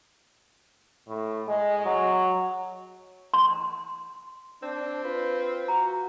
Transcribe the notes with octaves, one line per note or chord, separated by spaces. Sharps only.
A2
G#3
F#3
C6
C4 D4
F4 B4
F#4 A#5